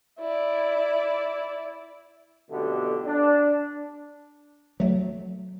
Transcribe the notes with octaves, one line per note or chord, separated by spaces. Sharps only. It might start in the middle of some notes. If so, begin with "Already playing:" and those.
E4 D5
B1 F2 B2 D3 A3 G4
D4
F#3 A3